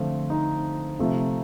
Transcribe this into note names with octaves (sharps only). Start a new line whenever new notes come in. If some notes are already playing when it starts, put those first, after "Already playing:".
Already playing: D3 F3 A3 C4 F4
D#4
C3 F3 A3